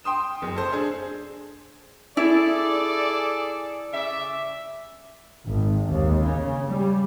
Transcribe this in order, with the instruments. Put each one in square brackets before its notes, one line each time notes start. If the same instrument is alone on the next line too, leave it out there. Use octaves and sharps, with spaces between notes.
[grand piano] G5 C6 D#6 E7
F#1
A4 C5
D4 G#4
[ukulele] E4 [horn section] G#4 A4 D5
[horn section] C#3 D5 E5
[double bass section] G#1
D#2
C#3
G3